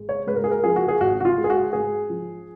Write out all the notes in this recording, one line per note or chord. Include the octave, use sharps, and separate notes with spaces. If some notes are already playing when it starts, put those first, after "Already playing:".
Already playing: G#1 G#3
C#5
G#2 B4
A#4
G#4
A#4
F3 G#4
F#4
G#4
G#1 F#4
F#4
F4
G#3
G#4
F#4
G#2 G#4
F3